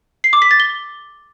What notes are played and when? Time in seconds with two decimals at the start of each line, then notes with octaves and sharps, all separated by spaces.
0.24 C7
0.33 D6
0.42 B6
0.51 A6
0.60 G7